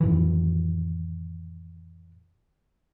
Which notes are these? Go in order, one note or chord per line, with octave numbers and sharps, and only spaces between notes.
F2 A2 D#3 E3